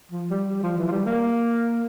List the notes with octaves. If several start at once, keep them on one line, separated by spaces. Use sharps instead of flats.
F3
G3
G3
F3
E3
F3
G3
A#3